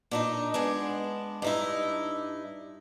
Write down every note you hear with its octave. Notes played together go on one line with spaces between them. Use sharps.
A#2 D4 D#4
G#3 B3 D4
G2 D#4 E4